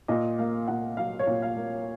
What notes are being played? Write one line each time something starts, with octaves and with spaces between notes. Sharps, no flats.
A#2 D#5
A#3 F5
A#2 F#5
F#3 F5
C#5
A#2
F5
A#3